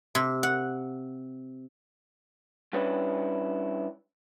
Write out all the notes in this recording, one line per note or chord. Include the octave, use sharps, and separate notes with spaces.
C3
F#5
G3 C#4 D4 E4 B4 C#5